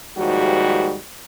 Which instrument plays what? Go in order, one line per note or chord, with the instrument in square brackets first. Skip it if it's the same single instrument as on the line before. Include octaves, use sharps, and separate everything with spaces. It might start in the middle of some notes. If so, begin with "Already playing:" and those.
[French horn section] D#2 G#2 F3 G3 F#4